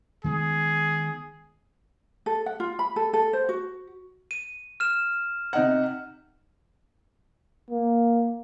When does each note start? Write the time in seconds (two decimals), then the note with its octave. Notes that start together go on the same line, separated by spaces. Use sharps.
0.24 D#3 G#3 B3 G#4
2.26 A4
2.46 F#5
2.60 F4
2.79 B5
2.96 A4
3.13 A4
3.33 C5
3.49 F#4
4.31 D#7
4.80 F6 E7
5.53 C3 D#4 F#5
7.71 A#3